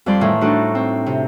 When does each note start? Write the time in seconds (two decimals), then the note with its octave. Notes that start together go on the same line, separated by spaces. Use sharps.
0.06 F2 G3 D5 C6
0.20 A2 D#3 E3
0.41 A3 D4 D#4 F#4 A4
0.75 C4
1.06 C3